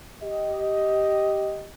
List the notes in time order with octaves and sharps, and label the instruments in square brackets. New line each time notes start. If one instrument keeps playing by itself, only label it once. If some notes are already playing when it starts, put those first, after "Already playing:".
[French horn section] G4 D#5